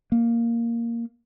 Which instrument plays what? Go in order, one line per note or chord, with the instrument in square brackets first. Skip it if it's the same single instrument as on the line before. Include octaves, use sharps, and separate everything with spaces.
[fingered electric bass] A#3